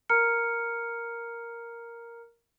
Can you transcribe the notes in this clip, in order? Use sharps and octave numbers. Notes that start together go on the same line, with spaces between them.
A#4 A#5 F6 C#7